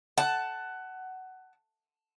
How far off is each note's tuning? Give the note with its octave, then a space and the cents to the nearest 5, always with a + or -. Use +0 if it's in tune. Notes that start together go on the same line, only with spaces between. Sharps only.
F#5 +15 A5 +0